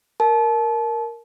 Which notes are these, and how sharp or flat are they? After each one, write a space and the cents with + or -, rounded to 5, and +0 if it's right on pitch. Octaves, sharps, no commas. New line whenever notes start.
A#4 +0 A5 -30